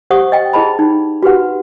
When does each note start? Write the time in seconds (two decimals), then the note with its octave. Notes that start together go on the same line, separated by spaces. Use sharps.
0.10 G4 C5 F#5 C#6 D#6
0.32 D#5 G5
0.53 E4 G#4 D#5 A5 B5
0.79 D#4
1.23 F#4 G4 B4 F#5